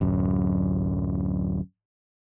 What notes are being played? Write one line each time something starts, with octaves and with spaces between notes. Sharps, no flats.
D1 F#2